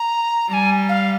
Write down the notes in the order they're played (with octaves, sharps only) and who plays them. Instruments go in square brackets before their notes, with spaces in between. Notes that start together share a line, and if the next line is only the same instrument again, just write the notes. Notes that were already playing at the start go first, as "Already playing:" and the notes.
Already playing: [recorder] A#5
[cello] G3 [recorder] A#5
[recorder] G#5
F5